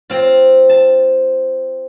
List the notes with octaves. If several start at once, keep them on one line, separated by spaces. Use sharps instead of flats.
C4 F4
A5